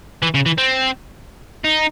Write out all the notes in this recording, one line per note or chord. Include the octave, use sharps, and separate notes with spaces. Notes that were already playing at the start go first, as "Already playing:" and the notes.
E3
C#3
E3
C4
D#4